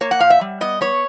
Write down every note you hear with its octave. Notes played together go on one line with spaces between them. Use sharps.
A#3 C#5
F#5
A#2 F5
E5
G3
B3 D#5
B3 C#5